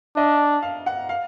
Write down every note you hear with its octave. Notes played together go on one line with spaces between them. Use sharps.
D4 D#5
F5
F#5
F5